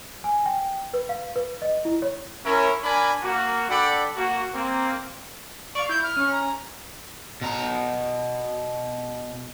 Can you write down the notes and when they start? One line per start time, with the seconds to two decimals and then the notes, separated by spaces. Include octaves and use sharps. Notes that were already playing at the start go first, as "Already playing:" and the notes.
0.24 G#5
0.46 G5
0.94 B4
1.09 F5
1.36 B4
1.62 D#5
1.85 E4
2.02 C#5
2.45 C#4 E4 A#4
2.82 D4 A#4 G#5 B5
3.22 A#3 F#4
3.68 D4 A4 D5 F#5 G5 B5
4.16 A#3 F#4
4.54 A#3 C4
5.75 D5 F5 C#6
5.89 E4 G6
6.03 F6
6.17 C#4
6.32 A#5
7.41 B2 A#5